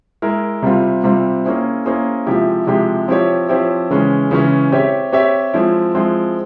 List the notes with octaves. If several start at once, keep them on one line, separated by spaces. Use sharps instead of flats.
G#3 E4 A#4
C3 G3 C4 F4
C3 G3 C4 F4
A#3 C#4 E4 G#4 C5
A#3 C#4 E4 G#4 C5
C3 F3 G#3 E4 G4
C3 F3 G#3 E4 G4
F3 C4 E4 G4 C#5
F3 C4 E4 G4 C#5
C#3 E3 G#3 C#4
C#3 E3 G#3 C#4
C4 G4 C#5 E5
C4 G4 C#5 E5
F3 G#3 C4 E4
F3 G#3 C4 E4